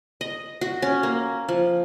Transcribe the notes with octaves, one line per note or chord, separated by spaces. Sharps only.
D#5
F#4
C#4
A#3
F3